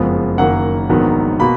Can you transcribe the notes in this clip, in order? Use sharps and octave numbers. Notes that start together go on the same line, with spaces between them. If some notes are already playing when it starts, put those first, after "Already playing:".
Already playing: F#1 F2 F3 G#3 B3
F#1 F#2 D#3 A#3 F#5
A#1 G#2 D#3 F#3 B3
B2 A#3 B5